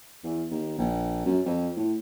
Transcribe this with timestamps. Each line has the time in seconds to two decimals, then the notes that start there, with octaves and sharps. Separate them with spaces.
0.24 E2
0.51 D#2
0.78 A#1
1.25 F#2
1.45 F2
1.77 A2